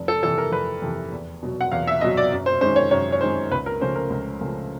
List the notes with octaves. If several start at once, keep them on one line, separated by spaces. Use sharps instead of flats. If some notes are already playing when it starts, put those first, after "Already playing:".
Already playing: F1
A4
F2 C3 E3 A4
A#4
F1 B4
F2 C3 E3
E2
B2 F#3
F#5
E2 F5
E5
B2 F#3 D#5
D5
F#2
C5
D#3 G#3 C#4 C5
C#5
F#2 C#5
C#5
D#3 G#3 C#4 C5
C#2 B4
A#4
C#3 F3 A3 C#4 C5
A#4
C#2
C#3 F3 A3 C#4